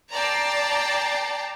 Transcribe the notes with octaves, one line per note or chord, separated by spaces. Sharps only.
D5 G5 A5 A#5 A6 C7